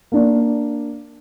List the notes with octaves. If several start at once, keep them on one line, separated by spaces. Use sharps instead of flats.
A#3 D4